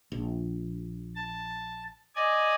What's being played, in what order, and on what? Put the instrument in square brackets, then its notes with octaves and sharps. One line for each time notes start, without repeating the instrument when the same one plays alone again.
[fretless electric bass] A#1
[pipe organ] A5
D5 D#5 G#5